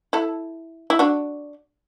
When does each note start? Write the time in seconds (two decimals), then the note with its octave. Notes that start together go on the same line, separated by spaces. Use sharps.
0.13 E4 A4
0.90 E4
0.99 D4 F#4